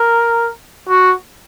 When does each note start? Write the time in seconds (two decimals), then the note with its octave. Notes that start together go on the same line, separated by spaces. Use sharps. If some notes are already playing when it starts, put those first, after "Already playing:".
Already playing: A#4
0.89 F#4